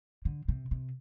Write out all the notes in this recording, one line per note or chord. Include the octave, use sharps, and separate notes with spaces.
D3
C3
C3